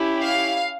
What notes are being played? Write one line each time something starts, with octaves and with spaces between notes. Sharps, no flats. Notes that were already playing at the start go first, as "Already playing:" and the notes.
Already playing: C#4 E4 G4
F5